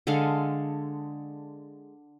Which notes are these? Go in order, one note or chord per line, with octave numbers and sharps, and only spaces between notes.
D3 G#3 A4 F5